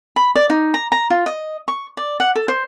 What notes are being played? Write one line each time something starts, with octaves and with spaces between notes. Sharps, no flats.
B5
D5
D#4
A#5
A#5
F4
D#5
C#6
D5
F#5
A4
C5